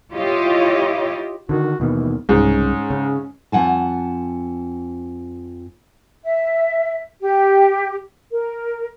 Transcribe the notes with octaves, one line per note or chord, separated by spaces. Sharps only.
E4 F4 G4 C#5 D#5
D3 D#3 F#4
D#2 B2 D#3 E3
C2 G#2 C#3 C#4
C#3
F2 F#5 G#5 A5
E5
G4
A#4